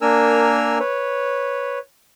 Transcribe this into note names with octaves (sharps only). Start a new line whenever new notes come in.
A#3 D4 A#4 G#5 E6 F6
B4 C#5